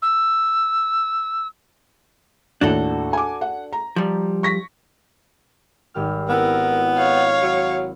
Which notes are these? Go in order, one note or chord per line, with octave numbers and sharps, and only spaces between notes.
E6
D#2 A2 D4 F#4 A4
G#5 D6
F#5
A#5
F3 G3
C#6 A#6 B6
G#1 G4 F6
B3 C4 E4 A#4
C#5 F5
F#3